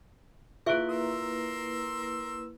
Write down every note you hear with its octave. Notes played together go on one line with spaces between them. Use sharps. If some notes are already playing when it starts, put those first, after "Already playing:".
A#3 E4 F4 G#4 B4 E5 C#6 F#6
A#4 C6 E6